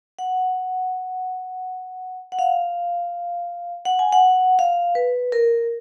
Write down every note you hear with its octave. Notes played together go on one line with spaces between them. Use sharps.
F#5
F#5
F5
F#5
G#5
F#5
F5
B4
A#4